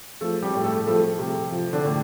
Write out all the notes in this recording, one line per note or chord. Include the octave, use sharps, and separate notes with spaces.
F3 A3 A4
G3 G4
A2
A3 A4
F3 A3 A4
C3
F3
D3 D4
A2